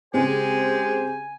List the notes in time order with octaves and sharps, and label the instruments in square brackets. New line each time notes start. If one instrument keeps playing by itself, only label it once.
[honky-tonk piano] C#3 C4 [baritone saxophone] G#3 [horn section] G4 C5 [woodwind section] G#5